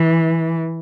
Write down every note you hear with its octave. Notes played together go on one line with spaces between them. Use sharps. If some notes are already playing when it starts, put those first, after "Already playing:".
Already playing: E3